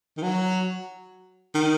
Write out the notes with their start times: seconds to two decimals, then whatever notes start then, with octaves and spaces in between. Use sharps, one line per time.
0.17 D#3
0.23 F#3
1.55 D#3